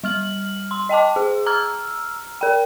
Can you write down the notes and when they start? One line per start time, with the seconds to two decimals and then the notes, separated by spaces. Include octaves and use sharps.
0.04 G3 F6 F#7
0.71 C6
0.89 D#5 G5 A5 D6
1.16 G#4
1.46 A#5 E6 F6
2.41 A#4 G5